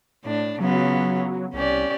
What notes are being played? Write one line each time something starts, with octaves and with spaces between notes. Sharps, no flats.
A2 D4
C#3 F#3 B3 F4
C2 C#4 G4 D5